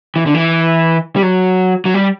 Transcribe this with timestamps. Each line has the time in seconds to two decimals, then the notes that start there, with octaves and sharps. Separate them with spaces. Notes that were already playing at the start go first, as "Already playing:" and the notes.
0.16 E3
0.26 D3
0.35 E3
1.16 G3
1.23 F#3
1.85 F#3
1.94 G3